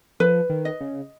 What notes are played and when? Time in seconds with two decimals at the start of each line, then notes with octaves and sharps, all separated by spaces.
0.20 F3 B4
0.50 D#3
0.65 D#5
0.80 C#3